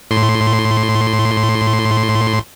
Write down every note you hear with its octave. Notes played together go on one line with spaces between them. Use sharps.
A2 C6